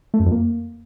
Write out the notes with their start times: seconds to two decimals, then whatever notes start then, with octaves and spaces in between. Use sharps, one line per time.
0.14 A3
0.20 F#2
0.26 F2
0.32 A#3